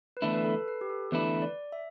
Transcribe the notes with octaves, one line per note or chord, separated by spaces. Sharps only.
B4
E2 D3 A3 E4 A4
B4
A4
B4
G4
A4
E2 D3 A3 E4 B4
D5
E5